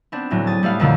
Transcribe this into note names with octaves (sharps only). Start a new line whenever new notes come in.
B3 C4 D4
D2 A2 F#3
G#4 D#6 A6
G3 A3 B3 F5
F2 A#2 D3 D#3 F#3